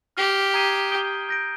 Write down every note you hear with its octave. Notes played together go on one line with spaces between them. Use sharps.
G4 F6 C7 F7
A#5 D#6 G#6 C7 D#7
D#6 G6 D7 G7
G6 A#6 D7